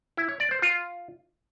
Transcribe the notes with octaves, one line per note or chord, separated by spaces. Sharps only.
E4
C#5
D5
C5
F4